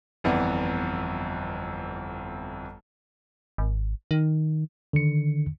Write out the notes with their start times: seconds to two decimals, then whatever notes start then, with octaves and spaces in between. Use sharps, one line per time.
0.24 G1 F2 E3 B3 D5 F#5
3.58 G#1
4.11 D#3
4.93 D3 D#3 C#7